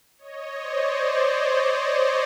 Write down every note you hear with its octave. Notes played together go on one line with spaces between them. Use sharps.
C#5 D#5
C5 D5